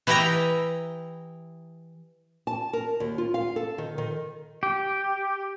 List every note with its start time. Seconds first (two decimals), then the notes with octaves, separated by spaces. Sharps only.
0.07 E3 E4 G4 D#5 G5 A#5
2.47 A5
2.73 A#4
3.00 D#2
3.18 F4
3.34 F5
3.56 A4
3.78 D#3
3.98 D#3
4.63 G4